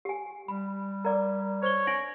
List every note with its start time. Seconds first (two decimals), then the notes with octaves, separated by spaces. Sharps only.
0.05 G4 G#5
0.48 G3 B5
1.05 A#4 D5 A#5 D6
1.63 C5 C#5 G7
1.87 D4 A#6 D7 F#7